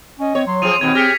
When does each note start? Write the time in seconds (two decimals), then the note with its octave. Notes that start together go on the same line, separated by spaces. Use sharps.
0.20 C#4 D#5
0.35 C4 C#5
0.46 F#3 C6
0.62 F3 C4 G#4 D#7 F7
0.81 D#2 B2 C4 G#6
0.95 G4 G#4 F6 A#6 B6 C#7